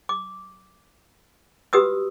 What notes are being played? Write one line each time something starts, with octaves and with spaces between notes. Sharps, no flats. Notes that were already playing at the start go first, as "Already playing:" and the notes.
D6
F#4 G4 B4 D#6 E6